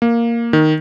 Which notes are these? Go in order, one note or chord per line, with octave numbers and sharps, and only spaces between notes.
A#3
D#3